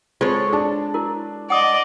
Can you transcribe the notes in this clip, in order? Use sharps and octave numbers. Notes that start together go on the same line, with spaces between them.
G#3 C4 F4 A4 C#5
D4 G#4 A5
E4 F#4 A#4
D5 D#5 F#5 D#6